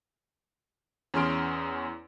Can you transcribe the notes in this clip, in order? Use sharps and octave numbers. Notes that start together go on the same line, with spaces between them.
E2 C#4 G#4 C6 F6 D7